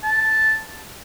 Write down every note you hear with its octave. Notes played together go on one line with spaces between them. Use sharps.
A5